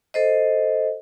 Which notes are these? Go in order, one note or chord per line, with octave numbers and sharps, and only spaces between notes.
A4 C5 D#5